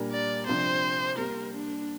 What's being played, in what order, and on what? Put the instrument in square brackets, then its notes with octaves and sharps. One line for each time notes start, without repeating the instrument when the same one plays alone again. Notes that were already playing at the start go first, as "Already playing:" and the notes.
Already playing: [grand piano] A#2 G3 D4 A#4
[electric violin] D5
[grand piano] C3 F3 D4 [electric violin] C5
[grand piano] G3 A#3 G4 [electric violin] A#4
[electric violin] D4